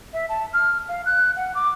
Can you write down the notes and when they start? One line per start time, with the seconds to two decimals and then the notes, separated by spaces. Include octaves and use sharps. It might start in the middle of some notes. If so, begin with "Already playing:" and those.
0.13 E5
0.29 A5
0.53 F6
0.89 F5
1.06 F#6
1.37 F#5
1.55 D6